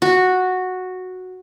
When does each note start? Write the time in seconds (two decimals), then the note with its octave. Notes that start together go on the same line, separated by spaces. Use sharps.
0.02 F#4